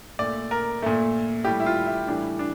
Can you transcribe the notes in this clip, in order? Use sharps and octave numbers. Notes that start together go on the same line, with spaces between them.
A#2 A3 D5
A#4
A#2 A3
A2 G3 G4
E4
F4
E4
A2 E3 G3 D4
D4